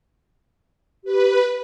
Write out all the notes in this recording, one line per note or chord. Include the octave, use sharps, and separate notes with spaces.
G4 B4